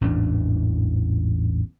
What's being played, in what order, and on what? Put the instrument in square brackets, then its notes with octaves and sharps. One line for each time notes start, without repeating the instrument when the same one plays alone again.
[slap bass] A1 E2 G#2 D4